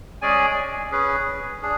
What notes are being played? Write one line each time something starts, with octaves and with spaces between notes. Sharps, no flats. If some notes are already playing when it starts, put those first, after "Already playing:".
G#3 C#4 G#4 D5 G#5
C#4 G#4 B4
D4 G#4